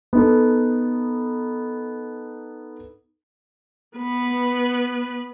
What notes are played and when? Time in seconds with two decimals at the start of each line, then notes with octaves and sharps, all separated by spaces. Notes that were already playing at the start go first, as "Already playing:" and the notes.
0.13 B3 D#4 A4
3.97 B3 B4